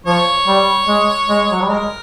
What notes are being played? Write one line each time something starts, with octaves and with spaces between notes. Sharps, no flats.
F3 C#5
G3
G#3
G#3
F#3
G3
G#3 A#4